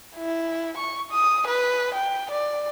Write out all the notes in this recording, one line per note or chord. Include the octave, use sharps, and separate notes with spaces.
E4
C#6
D#6
B4
G5
D5